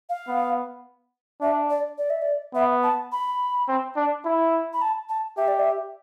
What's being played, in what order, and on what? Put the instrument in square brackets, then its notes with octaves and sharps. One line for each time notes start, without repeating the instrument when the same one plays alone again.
[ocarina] F5
[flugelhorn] B3
[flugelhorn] D4 [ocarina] E5
[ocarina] D5
D5
E5
D5
[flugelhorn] B3 [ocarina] E5
[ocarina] A5
B5
[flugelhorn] C4
D4
E4
[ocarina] B5
A5
A5
[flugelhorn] G4 [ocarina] E5
[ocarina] D5
E5